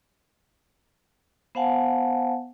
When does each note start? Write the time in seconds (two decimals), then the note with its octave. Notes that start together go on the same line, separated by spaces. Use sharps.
1.55 B3 C5 F5 F#5 G#5 A5